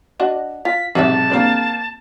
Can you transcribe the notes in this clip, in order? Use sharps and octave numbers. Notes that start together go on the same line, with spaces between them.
D4 F#4 D#5
F4 B6
B1 G#2 C3 G#4 D5 E5 A5
A#3 C4 D4